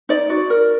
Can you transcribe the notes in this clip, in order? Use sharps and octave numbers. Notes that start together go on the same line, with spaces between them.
D#4 D5
F#4
A#4